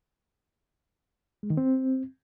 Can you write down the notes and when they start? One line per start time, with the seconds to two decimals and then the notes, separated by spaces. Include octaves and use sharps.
1.43 G#3
1.50 D#3
1.57 C4